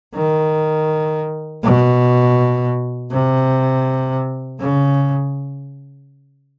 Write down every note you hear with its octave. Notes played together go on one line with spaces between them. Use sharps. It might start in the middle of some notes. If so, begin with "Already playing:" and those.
D#3
B2
C3
C#3